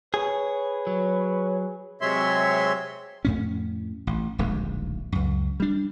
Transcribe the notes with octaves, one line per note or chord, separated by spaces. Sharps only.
G#4 B4 C#5
F#3
C3 F#3 G#3 C#5 E5 C6
F2 A2 C#4
A1
D1 A#1 D#2 G#3
C#2 F#2
G3 D4